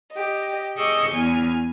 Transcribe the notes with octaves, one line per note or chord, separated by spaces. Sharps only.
G4 D#5
G#4 D#5 C#6 D6 E6 G6
E2 G#5 F6